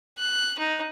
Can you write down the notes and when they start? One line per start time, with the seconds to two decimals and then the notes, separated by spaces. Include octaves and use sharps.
0.18 F#6
0.59 D#4